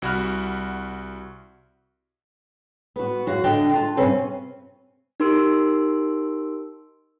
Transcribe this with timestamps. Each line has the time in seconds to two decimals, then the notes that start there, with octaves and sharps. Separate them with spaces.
0.02 C2 F#4 F#5 B5 F6 F#6
2.96 B3 F#4
3.26 F#2 F#4 F5
3.44 D3 D4 D#5 G5
3.73 F4 A5
3.97 G2 C3 C4 C#4 B4 G#5
5.20 D#4 G4 A#4 C6 E6 D7